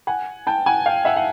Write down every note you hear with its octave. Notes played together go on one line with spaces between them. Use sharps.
F#5 G#5
G5 A5
F#5 G#5
F5 G5
E5 F#5
F#5